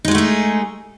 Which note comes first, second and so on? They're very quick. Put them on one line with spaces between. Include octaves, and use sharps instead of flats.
D#4 G#3 F#4 A3 G#4